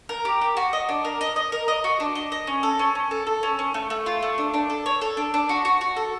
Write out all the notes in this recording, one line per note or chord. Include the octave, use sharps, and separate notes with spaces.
A#4
G4
G4
F#4
D#5
D4
A#4
D#5
D#5
A#4
D#5
F#4
D4
D#5
D#5
C#4
A4
C#4
C#4
A4
A4
C#4
C#4
A3
A3
F4
A3
D4
D4
A4
C#5
A4
D4
D4
F#4
F#4
F#4
A4